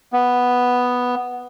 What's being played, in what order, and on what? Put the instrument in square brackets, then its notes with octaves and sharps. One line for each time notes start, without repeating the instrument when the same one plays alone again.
[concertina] B3